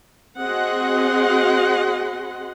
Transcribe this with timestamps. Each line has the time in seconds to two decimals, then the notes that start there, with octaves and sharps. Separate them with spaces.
0.40 C4 F#4 G#4 D#5 F#5 C6